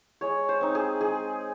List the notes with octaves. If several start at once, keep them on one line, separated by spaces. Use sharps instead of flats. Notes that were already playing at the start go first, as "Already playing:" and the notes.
G#3 C#5
C5
C4 D#4
G#4
G#3 G#4